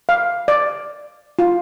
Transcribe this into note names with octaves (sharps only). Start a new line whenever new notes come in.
F5
D5
F4